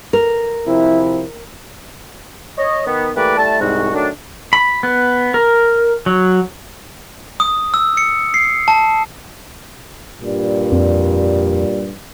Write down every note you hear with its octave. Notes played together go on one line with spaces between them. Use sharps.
A#4
C3 F3 E4
C#5 D#5
D#3 B3
E3 A3 A#3 G4 B4 D5
G3 A3 E4 A5
C2 G#2 F#4
D#3 F#3 A3 D4
B5
B3
A#4
F#3
D#6
E6
C#7
C7
A5
G2 A#2 G3
F2